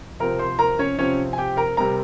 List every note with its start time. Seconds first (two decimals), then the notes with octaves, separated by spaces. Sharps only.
0.20 C3 F3 C4 A#4 A#5
0.39 C5 C6
0.59 A#4 A#5
0.79 C#4 C#5
0.98 C3 F3 C4 C#4 C#5
1.33 G#5
1.38 G4 G5
1.57 A#4 A#5
1.77 C3 G3 C4 A#4 A#5